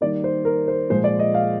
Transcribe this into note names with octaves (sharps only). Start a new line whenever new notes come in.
D#3 G3 A#3 D5
C5
A#4
C5
A#2 F3 G#3 C5
D5
D#5
F5